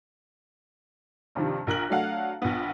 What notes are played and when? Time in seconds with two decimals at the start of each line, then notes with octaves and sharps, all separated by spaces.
1.35 G2 C3 D#3 F3 G3
1.67 A#1 A#4 F#6 F#7
1.89 F#3 A3 D4 F5 F#5
2.42 A#1 B3